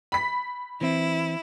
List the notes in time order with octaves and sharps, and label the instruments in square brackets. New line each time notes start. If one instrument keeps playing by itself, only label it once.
[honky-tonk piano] B5 B6
[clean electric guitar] E3 C4 [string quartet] E4